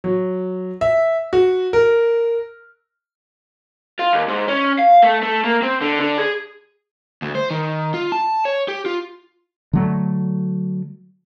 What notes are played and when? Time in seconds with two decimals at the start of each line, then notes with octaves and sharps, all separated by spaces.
0.04 F#3
0.81 E5
1.33 F#4
1.73 A#4
3.99 F4
4.13 D#2
4.28 G#2
4.48 C#4
4.79 F5
5.02 A3
5.23 A3
5.44 A#3
5.63 C4
5.81 D3
6.00 D3
6.18 G#4
7.22 D2
7.35 C5
7.51 D#3
7.94 F4
8.12 A5
8.45 C#5
8.68 G4
8.86 F4
9.73 D3 F#3 A3